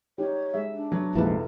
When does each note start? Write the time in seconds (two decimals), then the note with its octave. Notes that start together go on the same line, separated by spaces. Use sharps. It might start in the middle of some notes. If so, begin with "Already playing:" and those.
0.18 D#4 G4 C#5
0.54 G#3 G#4 E5
0.74 D4
0.91 F#3 B3
1.15 F1 A#1 G#2 C3 E4 F4 B4 A5